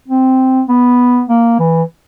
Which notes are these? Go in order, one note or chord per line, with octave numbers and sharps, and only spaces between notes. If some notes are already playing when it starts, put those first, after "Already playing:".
C4
B3
A#3
E3